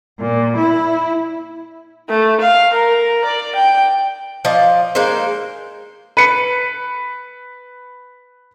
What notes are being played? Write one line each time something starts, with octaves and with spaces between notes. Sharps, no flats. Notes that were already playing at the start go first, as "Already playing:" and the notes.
A#2
E4
A3
F5
A#4
D5
G5
F3 D5 D#5
G#3 A#3 D#4 C5
B4 C#7